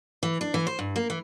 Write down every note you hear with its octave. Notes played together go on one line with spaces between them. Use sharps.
E3
D4
E3
C5
G2
A#3
E3